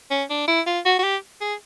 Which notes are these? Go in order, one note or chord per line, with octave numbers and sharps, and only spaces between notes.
C#4
D4
E4
F4
F#4
F#4
G4
G#4